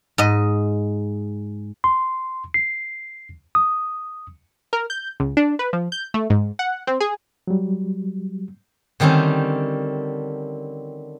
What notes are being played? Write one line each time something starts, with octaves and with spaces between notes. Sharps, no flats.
G#2 D#5
C6
C7
D#6
A#4
G6
C#2
D4
B4
F3
G6
A3
G#2
F#5
C4
G#4
F#3 G3
D3 D#3 G3 C4 C#4